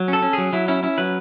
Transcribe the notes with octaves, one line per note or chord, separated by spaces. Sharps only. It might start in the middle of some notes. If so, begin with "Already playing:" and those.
Already playing: F#3
C#4
A4
C#4
F#3 G#4
F#3 E4
C#4 E4
C#4 E4
F#3 B4